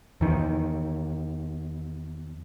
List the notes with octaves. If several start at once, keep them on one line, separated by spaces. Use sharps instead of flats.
E2 D#3